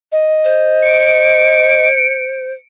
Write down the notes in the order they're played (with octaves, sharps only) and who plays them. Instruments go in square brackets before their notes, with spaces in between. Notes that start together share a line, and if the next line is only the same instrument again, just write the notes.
[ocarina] D#5
[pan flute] C5
[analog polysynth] C#7 D7